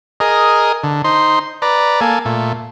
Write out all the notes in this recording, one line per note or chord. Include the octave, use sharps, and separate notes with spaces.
G#4 A#4 D#5
D3
D#4 C5 C6
B4 D5 A#5
A#3 A4 G#5
A#2 A3